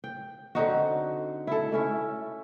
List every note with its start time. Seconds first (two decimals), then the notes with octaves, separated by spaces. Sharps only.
0.04 G5
0.55 D3 C4 D#4 F#4
1.47 E4 A4
1.72 A3 C#4 E4